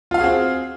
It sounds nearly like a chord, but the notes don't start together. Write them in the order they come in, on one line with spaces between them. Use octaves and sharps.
F4 F5 F#4 G#4 C4